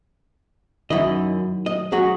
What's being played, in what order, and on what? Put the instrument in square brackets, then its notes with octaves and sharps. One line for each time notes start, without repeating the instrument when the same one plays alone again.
[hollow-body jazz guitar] F#2 E4 D#5 [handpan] D#3 F#3
[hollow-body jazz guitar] D#5
[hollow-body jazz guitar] F#3 C#4 F#4 [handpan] G#4